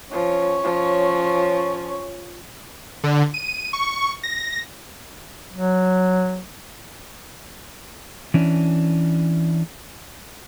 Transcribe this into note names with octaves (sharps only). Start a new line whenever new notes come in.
F3 C#4 C#5
F3
D3
D#7
C#6
A#6
F#3
E3 C#4 D4